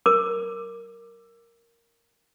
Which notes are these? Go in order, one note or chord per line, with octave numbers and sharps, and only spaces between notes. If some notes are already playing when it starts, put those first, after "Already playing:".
A#4 D6